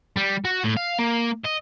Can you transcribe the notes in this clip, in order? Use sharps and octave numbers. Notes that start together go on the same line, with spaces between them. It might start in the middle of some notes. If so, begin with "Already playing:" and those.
G3
F#4
A2
F5
A#3
D#5